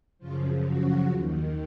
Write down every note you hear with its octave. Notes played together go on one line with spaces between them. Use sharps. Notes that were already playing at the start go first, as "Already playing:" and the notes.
F#2 C#3 F3 F4
F#4
D#2 D#3